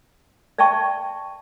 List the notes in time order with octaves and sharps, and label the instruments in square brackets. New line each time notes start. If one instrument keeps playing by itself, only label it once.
[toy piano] D5 E5 G5 A5 C#6